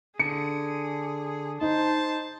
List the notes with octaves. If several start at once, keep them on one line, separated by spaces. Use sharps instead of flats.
D3 G#4 C#7
D#4 C5 A5